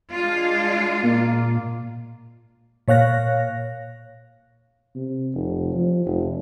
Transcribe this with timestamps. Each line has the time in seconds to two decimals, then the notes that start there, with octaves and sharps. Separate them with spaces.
0.14 G#3 D4 F4
1.03 A#2 A#3
2.88 A#2 C#5 F5 F#6 A#6
4.95 C3
5.34 F1
5.74 F3
6.06 F1